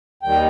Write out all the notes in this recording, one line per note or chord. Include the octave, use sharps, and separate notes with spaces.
D#2 D#3 G3 G5